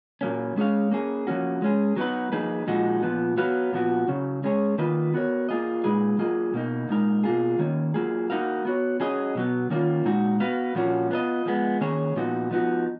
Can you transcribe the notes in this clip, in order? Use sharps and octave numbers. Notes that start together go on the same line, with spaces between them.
A#2 F#3 A#3 C#4
G#3 C#4 G#4 C#5 F5
A#3 C#4 G#4
F3 A#3 C#4 F#4
G#3 C#4 G#4
F#3 B3 D#4 F#4 B4
F3 A#3 D#4 G#4 B4
A#2 F3 G#3 D#4 F#4
A#2 F3 B3
F#3 B3 F#4 B4 F5
A#2 F3 B3 F#4
C#3 F#3 C#4
G#3 C#4 G#4 C#5
D#3 A#3 F4 B4 D#5
B3 F#4 A#4 C#5
A#3 F4 G#4 D#5
A#2 G#3 D#4 G#4 B4
F#3 A#3 F4 G#4 D#5
B2 A#3 D#4
A#2 G#3 D#4 A#4
B2 A#3 F4 G#4
D#3 A#3 C#4
F#3 A#3 F4 G#4
A#3 D#4 F#4 A#4 F5
B3 F#4 C#5
F#3 C#4 G#4 D#5
B2 F#3 B3
D#3 A#3 C#4 F4
A#2 G#3 D#4 F#4
B3 F#4 B4 F5
A#2 F3 A#3 C#4 F#4
B3 F4 A#4 D#5
F3 G#3 B3
D#3 A#3 C#4 G#4 C#5
A#2 F3 B3 D#4 F#4
F3 B3 D#4 F#4